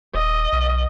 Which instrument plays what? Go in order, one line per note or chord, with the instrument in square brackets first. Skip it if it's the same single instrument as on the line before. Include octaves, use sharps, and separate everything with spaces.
[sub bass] D#1 [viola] D#5
[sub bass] B1